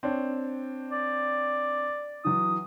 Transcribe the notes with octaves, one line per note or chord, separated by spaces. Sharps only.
C4 D4 C#5
D5
E3 F#3 D#6